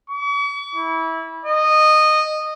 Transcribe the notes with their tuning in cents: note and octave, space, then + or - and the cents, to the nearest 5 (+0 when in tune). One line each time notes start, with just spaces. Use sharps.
C#6 +45
E4 -20
D#5 -15